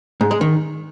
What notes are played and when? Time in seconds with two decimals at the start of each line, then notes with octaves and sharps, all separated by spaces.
0.21 G#2
0.31 G#3
0.41 D#3